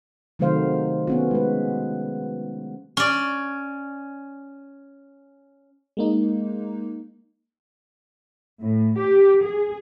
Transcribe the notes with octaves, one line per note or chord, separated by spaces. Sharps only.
C3 D#3 F#3 A3 C5 F5
B3 C#4 F#4
G#3 B4
C#4 D5
G#3 A#3 D#4
A2
G4
G#4